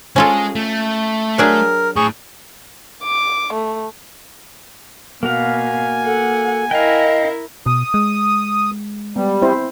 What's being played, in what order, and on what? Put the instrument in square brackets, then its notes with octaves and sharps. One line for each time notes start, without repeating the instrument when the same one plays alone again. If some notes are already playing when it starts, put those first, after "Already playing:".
[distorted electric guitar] G#3 G#4 [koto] C#4 F4 A4
[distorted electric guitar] A3
[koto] F#3 D4 G#4 [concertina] A#4
[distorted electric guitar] A2 [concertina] G#4 C#6
[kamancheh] D6
A3
[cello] B2 [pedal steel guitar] A#3 F#4 F5 [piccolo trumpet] G#5
[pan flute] A4 [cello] F#5
[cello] E4 A#4 [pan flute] D#5 [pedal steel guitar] F5 G5
[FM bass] B2 [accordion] D#6
[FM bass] G#3
[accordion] G3 [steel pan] B3
[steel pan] C4 E4 C5